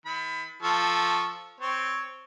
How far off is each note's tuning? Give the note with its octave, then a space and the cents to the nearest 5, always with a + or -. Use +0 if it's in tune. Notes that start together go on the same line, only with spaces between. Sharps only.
D#3 +45 B5 +25
F3 +0 A4 +0 C#6 +0
C4 +0 C#5 +0